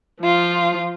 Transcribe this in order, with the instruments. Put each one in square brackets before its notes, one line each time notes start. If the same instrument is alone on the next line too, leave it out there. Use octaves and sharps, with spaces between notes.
[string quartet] F3 F4